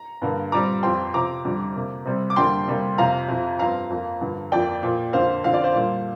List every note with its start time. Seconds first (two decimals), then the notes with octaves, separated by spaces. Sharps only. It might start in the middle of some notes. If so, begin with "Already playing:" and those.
Already playing: A#5
0.22 G2 D3 A#3
0.52 A#2 G3 C4 A#5 D6
0.83 F2 F3 C4 G5 C6
1.14 C3 F3 C4 A#5 D6
1.45 F2 D3 G3 C4
1.76 C3 A#3
2.05 C3 G3 C4
2.30 D6
2.36 F2 D3 G3 A#3 G5 C6
2.68 C3 G3 A#3
2.98 F2 C3 F3 F5 A#5
3.29 F2 C3 F3
3.59 G2 F3 C4 F5 A#5
3.90 F2 F3 A#3
4.21 G2 D3 F3
4.52 F2 F3 A#3 D5 G5
4.83 A#2 F3 A#3
5.13 F2 D3 A#3 C5 F5
5.44 F2 D3 F3 C4 F5
5.54 D5
5.64 C5 F5
5.75 A#2 G3 A#3